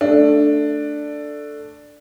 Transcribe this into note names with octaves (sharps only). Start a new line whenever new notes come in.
A3 D4